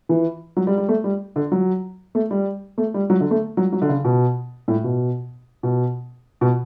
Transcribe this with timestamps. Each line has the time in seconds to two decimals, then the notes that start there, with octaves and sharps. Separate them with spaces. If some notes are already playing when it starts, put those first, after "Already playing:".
0.09 E3
0.57 F#3
0.67 G3
0.78 G3
0.89 A3
1.04 G3
1.36 D3
1.52 F#3
2.15 A3
2.31 G3
2.78 A3
2.94 G3
3.10 F#3
3.21 D3
3.31 A3
3.57 F#3
3.72 F#3
3.82 D3
3.89 C#3
4.04 B2
4.68 A2
4.84 B2
5.63 B2
6.41 B2